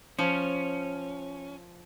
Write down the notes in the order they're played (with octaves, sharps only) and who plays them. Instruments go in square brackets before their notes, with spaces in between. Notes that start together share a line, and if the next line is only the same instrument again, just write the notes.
[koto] F3 [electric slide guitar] C#4